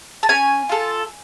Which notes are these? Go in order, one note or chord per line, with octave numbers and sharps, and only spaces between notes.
A5
C#4 G#5
F4 A4